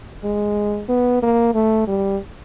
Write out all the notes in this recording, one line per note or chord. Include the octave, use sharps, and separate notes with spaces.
G#3
B3
A#3
A3
G3